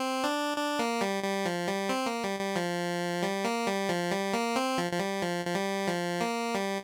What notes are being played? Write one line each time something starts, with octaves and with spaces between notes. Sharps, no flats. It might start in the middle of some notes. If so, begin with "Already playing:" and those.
Already playing: C4
D4
D4
A#3
G3
G3
F3
G3
C4
A#3
G3
G3
F3
G3
A#3
G3
F3
G3
A#3
C4
F3
F3
G3
F3
F3
G3
F3
A#3
G3